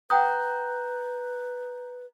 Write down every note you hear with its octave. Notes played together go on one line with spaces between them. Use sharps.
B4 F#5 G5 A#5 D#6 F#6 G6